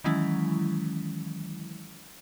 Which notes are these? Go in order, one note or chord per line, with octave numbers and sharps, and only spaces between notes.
D#3 E3 F#3 G#3 C#4 E4